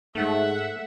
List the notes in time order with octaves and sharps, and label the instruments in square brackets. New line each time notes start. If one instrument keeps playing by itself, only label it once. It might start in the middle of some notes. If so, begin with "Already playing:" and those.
[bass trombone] G#2 [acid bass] A3 [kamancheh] E5 F#5